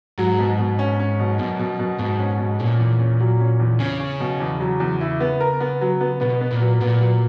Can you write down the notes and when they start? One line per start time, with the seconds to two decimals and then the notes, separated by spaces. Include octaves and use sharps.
0.18 G#2 F#3
0.39 B2
0.59 B2
0.79 C#4
1.00 C#4
1.20 B2
1.39 F#2 B2
1.59 B2
1.79 B2
1.99 G#2 B2
2.19 C#4
2.39 B2
2.59 A#2 C#4
2.79 E2
3.00 C#4
3.20 F#3
3.41 C#4
3.60 E2
3.80 C#3 C#4
4.00 C#4
4.20 B2
4.40 E2
4.60 F#3
4.80 E2
5.01 E4
5.20 B3
5.40 A#4
5.60 B3
5.81 F#3
6.01 B3
6.21 B2 B3
6.41 B3
6.51 A#2
6.61 F#3
6.81 A#2 B3
7.01 F#3